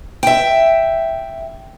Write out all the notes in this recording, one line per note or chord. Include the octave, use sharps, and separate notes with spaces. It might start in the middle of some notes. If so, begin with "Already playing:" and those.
E5 G5